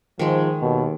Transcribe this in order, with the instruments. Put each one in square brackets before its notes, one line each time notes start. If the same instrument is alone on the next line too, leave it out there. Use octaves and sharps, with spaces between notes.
[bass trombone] G#2 [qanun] D#3 G#3 [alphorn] F3
[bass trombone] D#2 [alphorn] B2